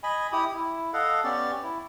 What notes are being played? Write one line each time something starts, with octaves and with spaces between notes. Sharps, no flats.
D#5 G#5 B5
E4 G4 D#6
E4
A4 D#5 F5 F#5
B3 C#4 G4 D5
E4